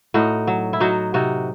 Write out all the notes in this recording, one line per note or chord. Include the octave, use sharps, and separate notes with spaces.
A2 D#4 F#4
F#3
E4
F#3 D#4 F#4
C3 D#4 F#4